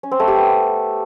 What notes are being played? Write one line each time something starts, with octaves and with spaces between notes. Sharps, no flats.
C#4
C4
A3
G4
B3